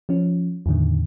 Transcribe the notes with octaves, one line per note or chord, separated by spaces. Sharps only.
F3 C#4
E2 A2 D3 D#3